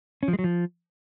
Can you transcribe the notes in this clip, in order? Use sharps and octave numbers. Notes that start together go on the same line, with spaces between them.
C#4
F3
G#3
F#3
F3